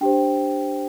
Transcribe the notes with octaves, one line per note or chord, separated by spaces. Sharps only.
D4 G4 C5 G5